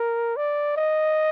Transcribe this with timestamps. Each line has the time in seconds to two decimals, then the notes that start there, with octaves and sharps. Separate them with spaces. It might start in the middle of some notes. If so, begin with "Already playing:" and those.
Already playing: A#4
0.37 D5
0.76 D#5